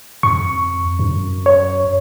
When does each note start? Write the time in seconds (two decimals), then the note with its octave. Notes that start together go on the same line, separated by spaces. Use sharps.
0.23 F2 C#6
0.99 F#2
1.46 C#5